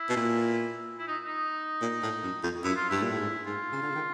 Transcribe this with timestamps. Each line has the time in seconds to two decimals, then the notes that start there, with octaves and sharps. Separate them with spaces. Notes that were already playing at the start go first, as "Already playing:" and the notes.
Already playing: E4
0.09 B2
0.16 A#2
0.99 E4
1.08 D#4
1.24 D#4
1.81 A#2
2.02 A2
2.23 F#2
2.43 F2
2.64 F#2 E4
2.76 F4
2.89 G2 E4
3.03 A#2 E4
3.10 A2
3.18 G#2
3.46 G#2 F4
3.72 C#3
3.82 D3
3.90 C#3
3.95 D#3